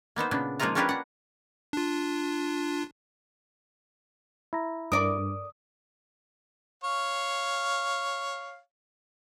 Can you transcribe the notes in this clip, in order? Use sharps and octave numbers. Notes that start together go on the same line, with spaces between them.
A#3 B3 D#4 C5
A#2 C#3 B3 D4
F3 G#3 A#3 D#4 F4 A#5
A#3 C#4 D4 G4 A#4 B4
D4 F#5
D4 F4
E4 A#5
G2 A#4 D5 D#6
C#5 F5